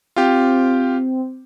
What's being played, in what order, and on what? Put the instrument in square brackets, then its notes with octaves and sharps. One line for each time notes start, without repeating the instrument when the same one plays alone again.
[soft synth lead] C4 [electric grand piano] F4 G4